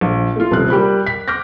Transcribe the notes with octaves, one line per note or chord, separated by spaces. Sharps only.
A#1
A3 F4
D#1 C3 F3 F#6
G3 G4 A#4 B5
B6
D6 F6 G6 A#6